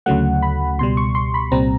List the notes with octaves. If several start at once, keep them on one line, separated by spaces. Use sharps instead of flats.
D2 C#3 F#3 A3 F#5
B5
C#2 B2 G3 C6
C#6
C6
B5
C2 A#2 G3 C4 A#5